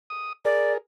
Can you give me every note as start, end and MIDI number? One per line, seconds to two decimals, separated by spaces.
0.10 0.33 87
0.45 0.78 68
0.45 0.78 70
0.45 0.73 74